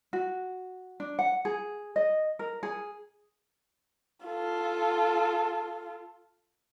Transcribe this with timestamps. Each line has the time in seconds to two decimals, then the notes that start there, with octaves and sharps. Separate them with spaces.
0.13 F#4
1.00 D4
1.19 F#5
1.45 G#4
1.96 D#5
2.39 A#4
2.63 G#4
4.25 F4 A4